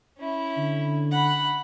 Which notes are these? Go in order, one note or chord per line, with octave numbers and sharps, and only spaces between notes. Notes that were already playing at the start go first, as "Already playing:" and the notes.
C#4 E4
D3
F#5 B5